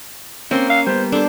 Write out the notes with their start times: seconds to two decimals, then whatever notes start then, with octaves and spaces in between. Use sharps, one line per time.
0.51 A#3 C4 C#4 C6
0.69 F5
0.87 G3 B3 C5
1.12 D4 A4 C5